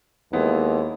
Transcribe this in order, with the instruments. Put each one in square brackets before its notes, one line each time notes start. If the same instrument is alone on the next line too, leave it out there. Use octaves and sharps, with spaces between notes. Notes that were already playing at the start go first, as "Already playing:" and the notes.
[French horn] D#2 [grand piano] G#3 B3 E4